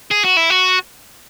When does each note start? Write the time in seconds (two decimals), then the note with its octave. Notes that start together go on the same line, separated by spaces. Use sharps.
0.11 G#4
0.25 F#4
0.37 E4
0.50 F#4